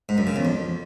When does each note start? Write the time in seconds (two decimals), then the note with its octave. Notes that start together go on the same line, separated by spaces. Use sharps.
0.09 G#2
0.18 F#2
0.27 C#3
0.36 E2
0.45 F2